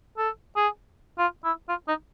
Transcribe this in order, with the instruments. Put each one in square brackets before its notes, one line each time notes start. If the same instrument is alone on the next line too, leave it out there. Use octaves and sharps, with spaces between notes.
[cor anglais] A4
G#4
F4
E4
F4
D#4